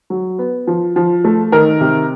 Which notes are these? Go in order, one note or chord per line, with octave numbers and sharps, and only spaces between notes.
F#3
B3
F3
F3
A3
D#3 A#4
C3